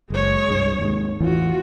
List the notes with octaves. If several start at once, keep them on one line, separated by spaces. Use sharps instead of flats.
F#1 G#3 C#5
C2 G2
D#2 G#2
E2 A2 E3 F4 F#4